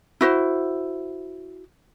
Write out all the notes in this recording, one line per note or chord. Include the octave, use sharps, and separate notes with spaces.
E4 F#4 C5